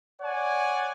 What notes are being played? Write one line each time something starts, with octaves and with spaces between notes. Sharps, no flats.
C#5 D5 F#5 G#5